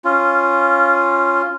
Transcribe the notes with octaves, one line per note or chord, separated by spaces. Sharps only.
C#4 F4